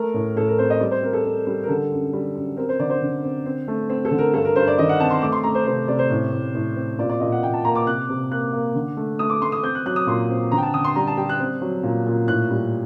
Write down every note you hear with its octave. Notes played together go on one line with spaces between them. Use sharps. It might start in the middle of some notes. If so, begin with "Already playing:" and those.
Already playing: A3 A#4
A2
A2 A4
A#4
C4 C5
D#5
G3 D5
C5
C4 A#4
A4
C4 A#4
G3
A#4
D3 A4
F#2
G3
F#2
C4 A#4
C5
D3 D5
C5
D3
C4
C4
A3
C4
A4
D3
A#4
G2 A4
A#4
G2 C5
D5
D#3 D#5
F#5
C4 A5
C6
A3 D6
C6
A3 A#5
C5
C3 C5
C3 D5
C5
A2
A2
A2
C4
A#2 D5
D5
A#2 D#5
F#5
A#2 G5
A5
A#3 A#5
D6
C3 F#6
C3
A#3 F#6
A#3
D3
A3
A3 D#6
D6
A3 C6
D#6
C4 G6
F#6
F#3 F#6
D#6
A#2 C6
C4
D3 A#5
G5
A5
D3 D#6
C6
G3 A#5
A5
G3 G5
F#6
C4
F#3
A#2
A#2
A2 F#6
G3